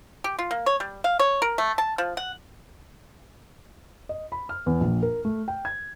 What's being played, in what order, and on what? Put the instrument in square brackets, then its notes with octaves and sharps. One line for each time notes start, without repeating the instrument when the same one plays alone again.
[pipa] G4
F4
A#3
C#5
G3
F5
C#5
A#4
A3
A5
F3
F#5
[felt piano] D#5
B5
F6
E2
A#1
A#4
A3
G5
G#6